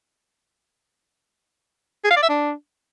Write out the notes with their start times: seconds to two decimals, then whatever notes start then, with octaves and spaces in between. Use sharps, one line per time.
2.04 G#4
2.11 F5
2.17 D5
2.23 E5
2.29 D4